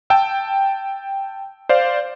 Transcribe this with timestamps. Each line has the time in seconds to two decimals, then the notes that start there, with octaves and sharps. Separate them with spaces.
0.10 G5 A5 E6
1.69 C5 D5 F5